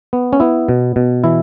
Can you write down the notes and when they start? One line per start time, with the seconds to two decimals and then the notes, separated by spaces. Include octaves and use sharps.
0.13 B3
0.33 C#4
0.40 B3 E4
0.69 B2
0.96 B2
1.24 E3 E4